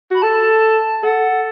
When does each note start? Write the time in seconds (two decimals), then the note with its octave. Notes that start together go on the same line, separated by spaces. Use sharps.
0.11 F#4 B5
0.22 A4 A5
1.03 A4 F#5